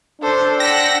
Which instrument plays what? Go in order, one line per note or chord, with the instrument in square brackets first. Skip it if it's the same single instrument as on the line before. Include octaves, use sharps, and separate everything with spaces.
[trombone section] D4 [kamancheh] A4 C5
[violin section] F#5 E6 B6 [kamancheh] G5 [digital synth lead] A#6